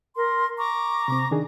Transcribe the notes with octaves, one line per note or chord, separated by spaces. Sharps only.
A#4 C6
A#5 C#6 D6
C3 C4
D#3 D4 G#4